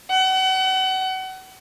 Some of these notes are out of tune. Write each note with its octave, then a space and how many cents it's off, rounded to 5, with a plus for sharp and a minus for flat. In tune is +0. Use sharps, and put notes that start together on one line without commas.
F#5 +35